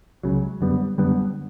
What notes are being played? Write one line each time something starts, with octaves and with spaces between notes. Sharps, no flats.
C#2 C#3 F#3
F#2 D3 G3 B3
F#2 D3 G3 B3